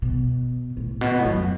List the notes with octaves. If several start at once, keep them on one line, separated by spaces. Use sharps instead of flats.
B2
A2
B2
A2
F#2